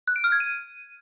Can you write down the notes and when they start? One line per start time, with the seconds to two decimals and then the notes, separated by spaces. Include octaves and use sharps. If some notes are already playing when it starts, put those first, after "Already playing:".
0.08 F#6
0.16 D7
0.24 F6
0.32 G#6
0.40 D#7